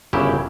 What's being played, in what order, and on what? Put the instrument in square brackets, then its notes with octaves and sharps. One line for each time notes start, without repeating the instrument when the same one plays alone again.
[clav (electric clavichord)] G1 F#2 C#3 F#3 E4 G4